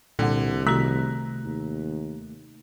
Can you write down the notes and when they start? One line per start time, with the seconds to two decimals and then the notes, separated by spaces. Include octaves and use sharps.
0.19 C2 A#2 D3 G3 F#5
0.67 C3 D#3 A3 F#4 A#5 F#6 B6
1.44 D#2